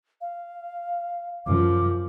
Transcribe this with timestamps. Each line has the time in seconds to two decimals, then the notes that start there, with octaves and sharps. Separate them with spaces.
0.21 F5
1.46 F#2 F3 D6